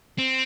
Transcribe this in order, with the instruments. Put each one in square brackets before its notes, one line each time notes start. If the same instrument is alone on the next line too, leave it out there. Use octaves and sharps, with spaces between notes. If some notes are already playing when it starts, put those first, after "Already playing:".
[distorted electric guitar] C4